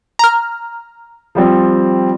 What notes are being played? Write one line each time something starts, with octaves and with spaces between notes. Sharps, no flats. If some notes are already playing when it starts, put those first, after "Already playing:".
A#5 F6
F3 G3 C4